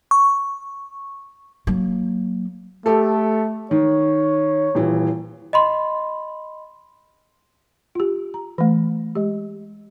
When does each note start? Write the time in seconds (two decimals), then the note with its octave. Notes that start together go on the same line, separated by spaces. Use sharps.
0.11 C#6
1.67 F#3 A#3
2.86 A3 G4 A4
3.71 D#3 C#5
4.75 D#1 E3
5.53 D#5 B5 C6
7.95 F4 G4
8.34 A#5
8.58 E3 A3
9.15 G#3 G4